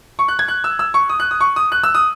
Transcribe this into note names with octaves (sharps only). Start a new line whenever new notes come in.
C#6
F#6
G#6
F#6
E6
E6
C#6
D#6
F#6
D#6
C#6
D#6
F#6
E6
D#6